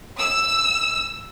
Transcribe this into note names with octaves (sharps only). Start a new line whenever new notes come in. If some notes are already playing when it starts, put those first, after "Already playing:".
E6